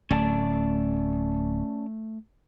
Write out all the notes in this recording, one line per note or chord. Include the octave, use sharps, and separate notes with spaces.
D1 A3 C#4 D5 A5